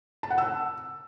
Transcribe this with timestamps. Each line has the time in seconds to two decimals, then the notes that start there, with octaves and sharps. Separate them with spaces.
0.23 A5
0.31 F#5
0.38 E6